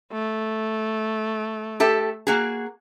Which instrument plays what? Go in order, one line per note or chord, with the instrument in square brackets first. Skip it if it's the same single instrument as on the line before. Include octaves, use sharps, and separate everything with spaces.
[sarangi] A3
[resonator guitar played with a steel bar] G4 A4 E5
A#3 F#4 G#4